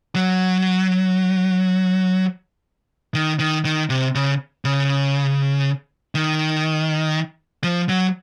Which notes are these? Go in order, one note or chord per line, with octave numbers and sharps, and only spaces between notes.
F#3
D#3
D#3
D#3
C3
C#3
C#3
D#3
F3
F#3